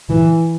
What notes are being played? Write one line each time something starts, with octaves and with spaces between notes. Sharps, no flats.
E3